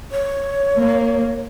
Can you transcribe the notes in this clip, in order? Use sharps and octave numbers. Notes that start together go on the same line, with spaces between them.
C#5
A#3